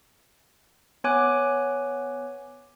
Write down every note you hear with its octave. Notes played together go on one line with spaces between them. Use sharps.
B3 C#5 G#5 D6 F#6